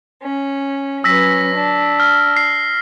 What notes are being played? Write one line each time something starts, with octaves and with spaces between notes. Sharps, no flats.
C#4
F#3 C#4 B4 E6 A#6 B6
D4
F6
C7